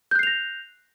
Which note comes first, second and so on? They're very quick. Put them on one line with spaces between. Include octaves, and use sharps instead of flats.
G6 F#6 C7 F7 A#6